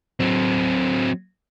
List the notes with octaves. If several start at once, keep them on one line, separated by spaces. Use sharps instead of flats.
F#3 C4